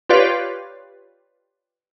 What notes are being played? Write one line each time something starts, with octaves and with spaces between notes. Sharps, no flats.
F4 G4 B4 C#5 D5 F5